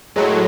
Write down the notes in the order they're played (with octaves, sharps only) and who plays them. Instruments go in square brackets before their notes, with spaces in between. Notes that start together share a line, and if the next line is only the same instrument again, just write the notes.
[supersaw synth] A2 F#3 [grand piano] G#3
[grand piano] A3